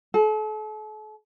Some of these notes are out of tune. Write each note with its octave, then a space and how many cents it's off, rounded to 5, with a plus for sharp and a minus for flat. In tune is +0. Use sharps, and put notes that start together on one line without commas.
A4 -40